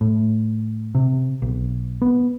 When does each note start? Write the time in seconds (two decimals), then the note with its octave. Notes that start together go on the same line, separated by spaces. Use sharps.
0.01 A2
0.95 C3
1.42 B1
2.02 B3